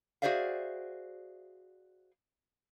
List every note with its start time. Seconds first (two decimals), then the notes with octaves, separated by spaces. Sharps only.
0.22 F#4 G#4 C5 D5 E5 F5